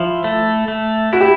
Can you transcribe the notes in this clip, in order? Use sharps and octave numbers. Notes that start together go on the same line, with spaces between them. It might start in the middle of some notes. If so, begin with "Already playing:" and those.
Already playing: F3 E4
A3
A3
E4 F#4
G4